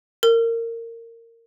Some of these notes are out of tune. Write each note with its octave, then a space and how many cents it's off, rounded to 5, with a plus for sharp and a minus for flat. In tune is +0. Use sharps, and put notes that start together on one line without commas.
A#4 -20